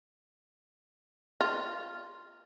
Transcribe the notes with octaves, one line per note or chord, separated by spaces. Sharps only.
F4